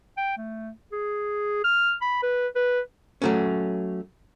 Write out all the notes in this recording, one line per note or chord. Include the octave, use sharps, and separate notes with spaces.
G5
A3
G#4
F6
B5
B4
B4
F#3 A3 C#4